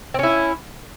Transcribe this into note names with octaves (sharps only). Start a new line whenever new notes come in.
C4 C#4 E4